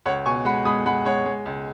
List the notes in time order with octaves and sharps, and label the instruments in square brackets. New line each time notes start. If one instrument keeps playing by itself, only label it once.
[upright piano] C#2 C#5 F#5
B2 G#5 C#6
G#3 F#5 B5
G#3 B5 D#6
G#3 F#5 B5
G#3 C#5 F#5
G#3
C#2